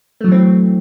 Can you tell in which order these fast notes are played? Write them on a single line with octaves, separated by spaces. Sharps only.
A3 F#3 E3 C4